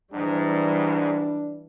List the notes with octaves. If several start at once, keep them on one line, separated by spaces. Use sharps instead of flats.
G#2 E3 G3 D4